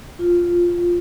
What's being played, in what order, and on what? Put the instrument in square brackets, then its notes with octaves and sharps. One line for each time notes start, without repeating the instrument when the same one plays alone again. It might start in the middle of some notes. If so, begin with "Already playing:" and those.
[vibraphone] F4